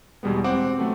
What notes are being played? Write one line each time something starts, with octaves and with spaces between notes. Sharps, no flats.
E2 B2 G3 G#3 B3
C4 F#5 D6
F#3 A3 B3